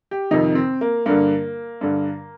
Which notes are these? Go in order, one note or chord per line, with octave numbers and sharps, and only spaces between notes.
G4
F2 C3 D#3 D#4
C4
A#3
G2 D3 A#3
G2 D3